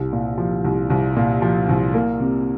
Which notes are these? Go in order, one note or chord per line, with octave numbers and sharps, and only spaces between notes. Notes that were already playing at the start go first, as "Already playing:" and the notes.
Already playing: C2
A#2
F3
C2
C2
A#2
F3
C2
A#3
C3